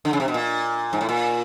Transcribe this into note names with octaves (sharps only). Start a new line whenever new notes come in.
D3
C#3
C3
B2
A#2
G#2
A2
A#2